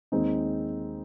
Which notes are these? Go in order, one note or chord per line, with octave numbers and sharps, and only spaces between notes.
D#2 D#3 G#3 C4 D#4